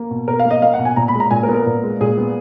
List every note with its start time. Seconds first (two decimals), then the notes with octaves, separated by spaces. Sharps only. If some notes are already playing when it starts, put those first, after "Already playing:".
Already playing: A#3
0.11 B2
0.28 B2 A#4
0.40 F5
0.45 A#3
0.51 D#5
0.62 A#3 F5
0.74 F#5
0.79 B2
0.85 G#5
0.96 A#2 A#5
1.08 B5
1.14 G#3
1.20 A#5
1.31 A#2 G#5
1.43 A#4
1.48 B3
1.54 A#4
1.66 A#2
1.83 G#3
2.01 A#2 G#4
2.17 B3